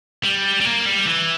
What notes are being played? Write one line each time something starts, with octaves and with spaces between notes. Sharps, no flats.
G3
G3
A#3
G3
E3